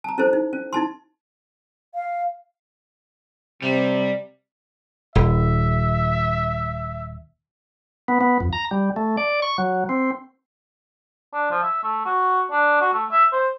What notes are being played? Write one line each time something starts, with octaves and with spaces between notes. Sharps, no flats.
A5 A#5
C#4 E4 A4 C5
D#4
C#4
D#4 E4 A5 C6
F5
C3 G3
D#1 E5
B3
B3
F2
A#5
G3
A3
D5
C#6
F#3
C4
D4
F3
E5
A3
F#4
D4
F#4
A3
E5
C5